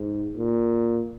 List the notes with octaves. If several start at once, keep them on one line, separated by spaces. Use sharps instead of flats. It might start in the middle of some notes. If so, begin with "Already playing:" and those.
Already playing: G#2
A#2